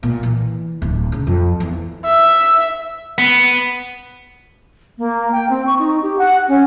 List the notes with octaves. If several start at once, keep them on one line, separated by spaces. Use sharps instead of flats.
A#2
E3
D1
C#3
F2
E2
E5
B3
A#3
G5
C4
C#6
D#4
G4
F#5
C#4